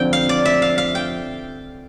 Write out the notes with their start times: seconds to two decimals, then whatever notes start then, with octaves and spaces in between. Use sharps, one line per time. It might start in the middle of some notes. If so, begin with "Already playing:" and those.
Already playing: F2 D3 F3 C4 G5
0.13 F5
0.29 D5
0.45 E5
0.62 F5
0.78 F5
0.95 G5